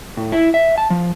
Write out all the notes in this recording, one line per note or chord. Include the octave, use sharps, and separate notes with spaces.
A2
E4
E5
A5
F3